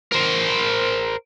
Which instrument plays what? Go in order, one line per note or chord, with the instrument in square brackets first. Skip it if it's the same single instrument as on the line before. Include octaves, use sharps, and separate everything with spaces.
[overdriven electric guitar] A#4 C5